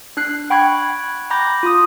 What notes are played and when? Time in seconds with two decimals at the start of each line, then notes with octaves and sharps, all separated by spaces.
0.17 D4 F#6 C7
0.50 F#5 G5 B5 C#6 F#6 G#6
1.30 A#5 B5 D6 G6 A#6
1.63 F4 D#6